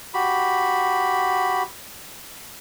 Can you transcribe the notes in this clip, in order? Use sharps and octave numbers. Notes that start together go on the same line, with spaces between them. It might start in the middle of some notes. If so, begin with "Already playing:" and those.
F#4 G4 B5